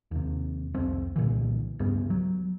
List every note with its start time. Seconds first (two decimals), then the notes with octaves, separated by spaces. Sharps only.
0.11 D#2 C3
0.74 C2 F2 C4
1.16 C2 A#2 D3 E3
1.79 C#2 G2 B3
2.10 F#3